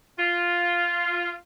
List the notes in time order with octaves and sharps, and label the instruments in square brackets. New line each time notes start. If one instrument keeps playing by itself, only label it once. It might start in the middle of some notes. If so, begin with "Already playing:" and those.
[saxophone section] F4